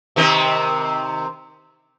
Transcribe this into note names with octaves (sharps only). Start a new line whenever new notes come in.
C3 D#3 C4